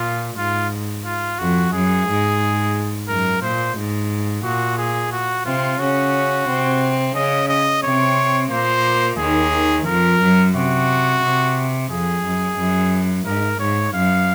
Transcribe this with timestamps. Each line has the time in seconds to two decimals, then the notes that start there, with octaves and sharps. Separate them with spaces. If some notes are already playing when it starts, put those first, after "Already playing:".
Already playing: A#2 F4
0.37 G#2 F4
1.05 F4
1.39 F2 F#4
1.72 F#2 G#4
2.07 G#2
3.08 F#2 A#4
3.42 A#2 C5
3.76 G#2
4.44 A#2 F#4
4.78 G#4
5.12 F#4
5.45 C3 C4 F4
5.80 C#3 C#4 F#4
6.48 C3 C4
7.16 C#3 C#4 D#5
7.49 D#5
7.83 C3 C4 C#5
8.51 A#2 A#3 C5
9.18 D#2 D#3 G#4
9.86 F2 F3 A#4
10.20 F#2 F#3
10.55 C3 F#4
11.22 C3
11.90 F2 G#4
12.25 F#2
12.58 F#2
13.26 G#2 A#4
13.60 G#2 C#5
13.94 F#2 F5